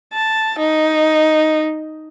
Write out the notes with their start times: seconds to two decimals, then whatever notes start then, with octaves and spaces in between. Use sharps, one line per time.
0.14 A5
0.59 D#4